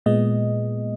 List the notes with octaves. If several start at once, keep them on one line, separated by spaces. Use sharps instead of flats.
A#2 G#3 B3 D#5